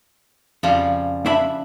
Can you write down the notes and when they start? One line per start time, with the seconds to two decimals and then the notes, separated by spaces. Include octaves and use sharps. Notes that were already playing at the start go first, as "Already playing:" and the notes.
0.63 F2 C#3 F3 G3
1.26 D4 E5 B5